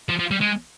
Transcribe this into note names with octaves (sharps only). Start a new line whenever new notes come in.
F3
F3
G3
G#3